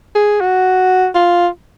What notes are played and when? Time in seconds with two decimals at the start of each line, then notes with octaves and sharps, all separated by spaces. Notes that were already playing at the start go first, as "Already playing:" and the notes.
0.15 G#4
0.41 F#4
1.15 F4